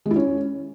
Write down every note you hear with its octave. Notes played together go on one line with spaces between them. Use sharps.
G#3
E4
C#4